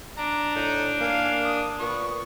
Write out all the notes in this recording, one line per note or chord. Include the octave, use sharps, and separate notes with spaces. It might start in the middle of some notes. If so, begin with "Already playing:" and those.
D4 A#5
A2 D#4
A#3 F5 G#5
D#6
A#2 B3 C#6